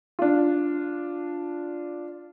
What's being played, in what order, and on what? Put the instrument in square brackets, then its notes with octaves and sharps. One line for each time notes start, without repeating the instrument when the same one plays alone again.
[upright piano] D4 F4